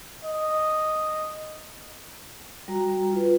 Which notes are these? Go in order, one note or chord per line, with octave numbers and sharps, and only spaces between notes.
D#5
G3 F#4 A#5
F4 B4